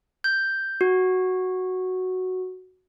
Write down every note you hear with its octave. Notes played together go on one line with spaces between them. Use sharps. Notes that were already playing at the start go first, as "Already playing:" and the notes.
G6
F#4